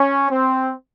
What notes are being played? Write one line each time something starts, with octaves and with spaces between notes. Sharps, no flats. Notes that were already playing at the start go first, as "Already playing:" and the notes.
Already playing: C#4
C4